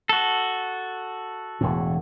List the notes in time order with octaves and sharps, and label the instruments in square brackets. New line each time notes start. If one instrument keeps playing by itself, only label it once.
[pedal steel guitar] F#4 A4
[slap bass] E1 A2